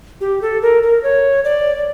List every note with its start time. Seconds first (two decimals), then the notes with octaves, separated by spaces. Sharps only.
0.21 G4
0.42 A4
0.62 A#4
0.83 A#4
1.03 C#5
1.44 D5